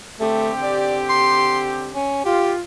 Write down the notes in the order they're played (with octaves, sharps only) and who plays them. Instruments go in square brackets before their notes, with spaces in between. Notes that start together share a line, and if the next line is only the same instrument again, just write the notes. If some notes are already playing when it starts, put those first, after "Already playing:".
[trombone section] D3 C4 G4 [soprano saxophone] A3
[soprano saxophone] D5
C6
C#4
[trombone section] F4 [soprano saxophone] G4